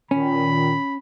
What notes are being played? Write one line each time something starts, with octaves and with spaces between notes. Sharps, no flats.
A#2 D#3 C#4 B5